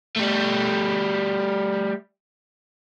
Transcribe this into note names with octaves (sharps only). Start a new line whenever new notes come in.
G3 A3